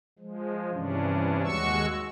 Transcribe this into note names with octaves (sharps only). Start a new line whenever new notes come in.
F3 G#3
G2 C3 E3 C#4 D4
D#2 G#3 F#4 C#6 E6